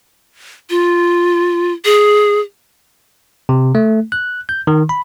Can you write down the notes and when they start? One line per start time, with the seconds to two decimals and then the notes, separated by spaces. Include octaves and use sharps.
0.70 F4
1.85 G#4
3.49 C3
3.75 A3
4.12 F#6
4.49 G6
4.67 D#3
4.89 B5